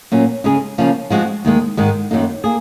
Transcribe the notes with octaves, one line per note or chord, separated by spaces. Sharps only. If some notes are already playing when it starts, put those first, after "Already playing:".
A#2 F#3 C#4
C#3 G#3 C#4 G#4
C#3 F3 A#3 C#4
F3 G#3 C4 F#4
D#2 D#3 G#3
G#2 D#3 G#3
F#2 D#3 F#3 A#3 D#4
A#3 G#4